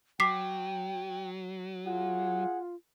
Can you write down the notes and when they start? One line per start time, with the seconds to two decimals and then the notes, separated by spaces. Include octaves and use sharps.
0.20 F#3 G5 D6 B6 C7
1.85 F4 G#4 F#5